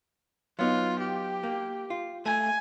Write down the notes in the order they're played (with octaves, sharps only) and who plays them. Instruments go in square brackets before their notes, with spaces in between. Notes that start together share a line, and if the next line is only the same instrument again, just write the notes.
[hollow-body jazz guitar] F#3 B3 D#4 [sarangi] F4
[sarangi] G4
[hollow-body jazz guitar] A#3
F4
[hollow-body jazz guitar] A3 [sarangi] G#5